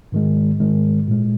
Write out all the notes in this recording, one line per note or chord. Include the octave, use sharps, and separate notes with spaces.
G#2 D#3 G#3
G#2 D#3 G#3
A#2 G#3